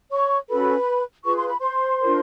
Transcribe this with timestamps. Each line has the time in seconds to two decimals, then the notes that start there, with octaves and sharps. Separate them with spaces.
0.11 C#5 C#6
0.49 C#4 F#4 A4 B4 B5
1.24 F4 G#4 B4 C#6
1.36 C6
1.47 B5
1.59 C5 C6
2.00 D4 F4 A#4